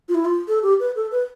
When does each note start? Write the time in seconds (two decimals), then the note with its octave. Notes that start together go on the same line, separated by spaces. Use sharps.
0.09 F4
0.15 E4
0.25 F4
0.48 A4
0.63 G4
0.80 B4
0.96 A4
1.11 B4